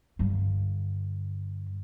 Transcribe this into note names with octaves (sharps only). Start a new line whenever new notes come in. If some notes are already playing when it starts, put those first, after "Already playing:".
G2 D3